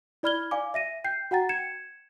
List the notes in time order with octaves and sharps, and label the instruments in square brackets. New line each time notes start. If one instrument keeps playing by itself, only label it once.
[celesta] E4 D5 B5 F6 G#6 G7
D5 F5 G#5 D6
E5 A#6 D#7
G5 G6 C7
F#4 F#5 G5 A#5 A6
G#6 C#7 E7